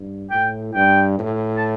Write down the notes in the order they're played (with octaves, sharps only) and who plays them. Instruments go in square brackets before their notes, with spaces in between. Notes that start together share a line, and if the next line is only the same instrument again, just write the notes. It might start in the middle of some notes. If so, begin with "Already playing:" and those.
Already playing: [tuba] G2
[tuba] A2 [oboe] G5
[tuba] G2 [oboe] G5
[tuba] A2
[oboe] A5